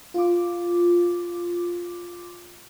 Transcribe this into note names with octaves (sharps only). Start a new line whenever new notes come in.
F4 D6